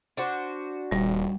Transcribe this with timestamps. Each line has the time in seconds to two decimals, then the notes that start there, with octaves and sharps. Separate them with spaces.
0.17 D4 F#4 C5
0.91 D#1 G3